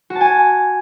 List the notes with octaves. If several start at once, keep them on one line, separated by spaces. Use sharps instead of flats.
F#4
A5
G#5